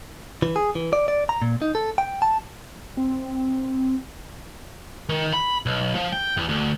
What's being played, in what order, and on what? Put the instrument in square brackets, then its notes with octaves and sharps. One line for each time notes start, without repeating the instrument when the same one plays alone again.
[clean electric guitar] E3
G#4
E3
D5
D5
A#5
A#2
D#4
A4
G5
A5
[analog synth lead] C4
[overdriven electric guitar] D#3
B5
B1
F3
G5
E2
D2